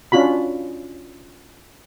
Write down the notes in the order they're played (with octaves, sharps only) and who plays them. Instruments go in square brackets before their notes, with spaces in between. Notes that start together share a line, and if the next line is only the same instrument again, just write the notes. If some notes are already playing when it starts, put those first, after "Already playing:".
[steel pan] C#4 D4 F4 F#4 B5